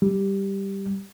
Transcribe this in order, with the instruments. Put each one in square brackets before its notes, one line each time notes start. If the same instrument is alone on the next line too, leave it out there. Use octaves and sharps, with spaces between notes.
[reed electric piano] G3